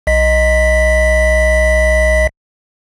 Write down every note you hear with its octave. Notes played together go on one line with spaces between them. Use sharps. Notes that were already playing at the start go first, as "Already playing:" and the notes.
B1 D#5 B6